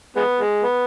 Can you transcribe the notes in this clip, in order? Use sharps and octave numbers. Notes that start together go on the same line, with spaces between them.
G#3 B3
G#3
B3